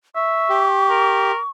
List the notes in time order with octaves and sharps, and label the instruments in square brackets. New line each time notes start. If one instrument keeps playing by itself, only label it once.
[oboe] E5 [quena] C#6
[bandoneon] G4
[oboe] A#4